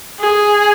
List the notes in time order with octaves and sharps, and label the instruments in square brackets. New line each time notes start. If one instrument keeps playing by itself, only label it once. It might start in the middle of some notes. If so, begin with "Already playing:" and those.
[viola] G#4